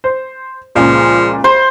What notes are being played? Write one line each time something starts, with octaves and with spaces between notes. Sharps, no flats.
C5
C#2 A#2 C#3 F3
C5